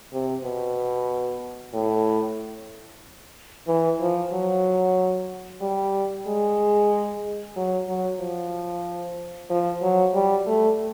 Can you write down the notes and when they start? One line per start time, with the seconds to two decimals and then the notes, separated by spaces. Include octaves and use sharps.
0.13 C3
0.44 B2
1.73 A2
3.67 E3
4.01 F3
4.33 F#3
5.61 G3
6.27 G#3
7.56 F#3
7.88 F#3
8.20 F3
9.50 F3
9.82 F#3
10.14 G3
10.46 A3